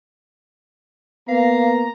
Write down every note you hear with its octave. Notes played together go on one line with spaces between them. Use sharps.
A#3 B3 F5 A#5